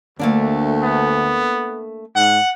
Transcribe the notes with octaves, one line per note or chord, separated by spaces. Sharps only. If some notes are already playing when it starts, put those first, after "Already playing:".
D2 A3 A#3 D4
B3
G#2 F#5